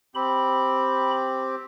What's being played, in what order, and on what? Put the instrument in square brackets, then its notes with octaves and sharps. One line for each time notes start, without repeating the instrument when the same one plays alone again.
[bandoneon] C4 G4 [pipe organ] B5